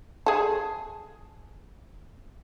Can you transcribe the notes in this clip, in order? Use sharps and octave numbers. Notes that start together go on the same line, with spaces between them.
G#4 A4